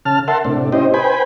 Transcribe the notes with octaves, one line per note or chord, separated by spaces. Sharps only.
C#3 A5 F6
A#4 E5 F#5 A5 C6
A2 C3 D4
C#4 E4 G4 C5 D#5
B4 C5 G5 G#5 B5